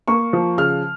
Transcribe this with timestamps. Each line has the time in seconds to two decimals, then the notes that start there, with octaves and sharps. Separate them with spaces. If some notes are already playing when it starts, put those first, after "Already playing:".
0.08 A#3 C#6
0.33 F3
0.58 C#3 F6